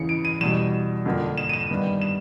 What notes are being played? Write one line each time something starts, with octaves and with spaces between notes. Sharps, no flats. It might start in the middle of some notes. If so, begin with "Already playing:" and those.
Already playing: E2 C#3 E3 C#7
D7
D#7
E2 B2 G3 E7
F2 D3 F3 A#3
E7
D#7
E7
G2 D#3 G3 B3
E7